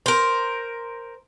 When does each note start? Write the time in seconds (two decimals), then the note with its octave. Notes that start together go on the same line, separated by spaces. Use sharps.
0.06 A#4 C5